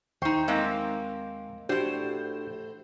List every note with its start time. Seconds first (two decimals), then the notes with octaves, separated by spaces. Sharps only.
0.22 D#2 D#4 C5 G5 C#6
0.48 G#3 A#3 C4
1.69 A2 D4 F#4 G4 C5